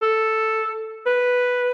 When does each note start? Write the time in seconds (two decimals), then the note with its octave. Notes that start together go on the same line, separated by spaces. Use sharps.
0.02 A4
1.07 B4